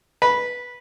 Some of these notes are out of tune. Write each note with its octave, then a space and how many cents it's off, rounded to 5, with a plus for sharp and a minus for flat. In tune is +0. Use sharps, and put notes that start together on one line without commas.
B4 -10